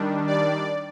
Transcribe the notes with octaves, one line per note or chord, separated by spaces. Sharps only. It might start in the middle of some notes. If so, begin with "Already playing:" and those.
Already playing: D#3 G3 D4
D5